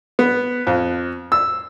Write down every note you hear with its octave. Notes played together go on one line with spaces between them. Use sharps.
B3
F2
E6